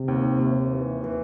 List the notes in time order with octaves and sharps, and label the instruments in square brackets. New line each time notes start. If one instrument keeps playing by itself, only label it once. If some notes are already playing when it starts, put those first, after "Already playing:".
Already playing: [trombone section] C3
[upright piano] D#2
D#2
E3
E3